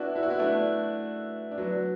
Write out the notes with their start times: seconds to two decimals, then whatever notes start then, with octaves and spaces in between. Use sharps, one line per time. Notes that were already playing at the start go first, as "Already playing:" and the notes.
Already playing: B3 D4 E4 F#4
0.16 E4
0.23 F#4
0.30 B3 E4
0.39 A3 D4
1.51 D4
1.58 F#3 B3